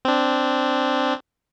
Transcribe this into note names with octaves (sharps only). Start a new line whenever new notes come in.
C4 D4